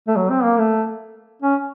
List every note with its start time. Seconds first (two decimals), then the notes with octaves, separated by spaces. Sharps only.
0.08 A3
0.16 F#3
0.30 C4
0.44 A#3
0.58 A3
1.42 C#4